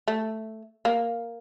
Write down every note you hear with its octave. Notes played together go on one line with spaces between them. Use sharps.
A3
A#3